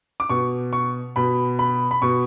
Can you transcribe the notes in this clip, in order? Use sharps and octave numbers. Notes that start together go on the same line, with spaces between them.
D6
B2 C#6
C#6
B2 B5
B5
B5
B2 C#6